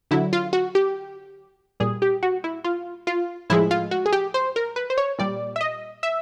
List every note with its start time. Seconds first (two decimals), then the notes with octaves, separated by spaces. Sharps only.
0.11 D3 F#3 E4
0.33 F4
0.53 F#4
0.75 G4
1.80 A#2 G3 G#4
2.02 G4
2.23 F#4
2.44 E4
2.64 F4
3.07 F4
3.50 A2 F3 G#3 E4
3.71 F4
3.91 F#4
4.06 G#4
4.12 G4
4.34 C5
4.56 A#4
4.76 B4
4.90 C5
4.98 C#5
5.19 A#2 G3 D5
5.56 E5
5.61 D#5
6.03 E5